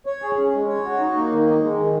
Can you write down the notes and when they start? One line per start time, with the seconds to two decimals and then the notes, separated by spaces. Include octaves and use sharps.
0.06 C#5
0.22 G#4
0.37 C#4
0.54 G#3
0.68 C#5
0.85 F#4
0.99 D#4
1.16 A#3
1.32 D#3
1.46 D#4
1.63 G#3
1.79 D#3